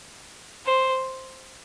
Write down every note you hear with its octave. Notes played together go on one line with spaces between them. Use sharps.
C5